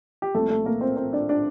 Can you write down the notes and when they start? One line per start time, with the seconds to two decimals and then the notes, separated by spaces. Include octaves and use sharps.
0.22 G4
0.35 C2 A#2 F3 A3 C4 A4
0.50 A3 A4
0.65 A#3 A#4
0.81 C4 C5
0.97 C4 C5
1.13 D4 D5
1.29 D4 D5